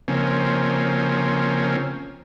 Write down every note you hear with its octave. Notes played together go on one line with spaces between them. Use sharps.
C#3 F3 A#3 C4 C#4